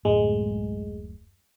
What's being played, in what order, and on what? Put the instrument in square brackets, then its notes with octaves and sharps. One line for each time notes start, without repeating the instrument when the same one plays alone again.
[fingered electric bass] D1 F#2 A2 [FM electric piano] G#3